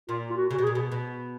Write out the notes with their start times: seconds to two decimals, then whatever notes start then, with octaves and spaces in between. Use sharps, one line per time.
0.09 A#2 F4
0.30 F4
0.36 F#4
0.51 C#3
0.53 F#4
0.58 B2
0.64 A#2 G#4
0.75 B2
0.91 B2